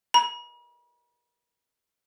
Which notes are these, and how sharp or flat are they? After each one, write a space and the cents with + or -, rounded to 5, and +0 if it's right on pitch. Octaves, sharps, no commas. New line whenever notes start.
B5 -45